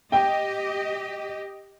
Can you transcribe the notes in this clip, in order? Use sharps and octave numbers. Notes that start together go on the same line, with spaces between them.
G4 D#5 G5